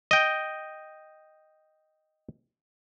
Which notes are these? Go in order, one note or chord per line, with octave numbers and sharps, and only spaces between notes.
D#5 G5